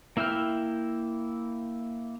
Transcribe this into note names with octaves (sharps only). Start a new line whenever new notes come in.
A#3 E4 E5 G5 F6